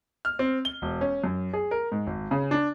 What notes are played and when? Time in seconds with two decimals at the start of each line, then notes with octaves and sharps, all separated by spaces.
0.25 F6
0.39 C4
0.65 G7
0.82 E1
1.01 C#4
1.24 F#2
1.53 G#4
1.71 A#4
1.92 G#2
2.07 G#1
2.31 C#3
2.51 D4